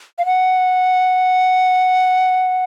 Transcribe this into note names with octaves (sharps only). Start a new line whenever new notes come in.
F5
F#5